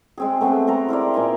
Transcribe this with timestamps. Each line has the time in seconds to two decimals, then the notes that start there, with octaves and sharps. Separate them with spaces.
0.17 G#3 C4 G#4
0.41 A3 B3 C4 A4
0.67 G#3 A4 C5 A#5
0.89 E4 A#4 C5 D5
1.14 A#2 D#4 G#5 C6